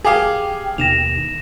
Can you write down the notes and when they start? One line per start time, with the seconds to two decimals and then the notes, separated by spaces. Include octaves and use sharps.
0.04 G4 G#4 F5
0.78 D#2 B2 D#3 A#6 E7 F7